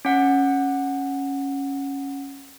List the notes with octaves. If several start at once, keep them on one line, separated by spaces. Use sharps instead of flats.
C#4 F#5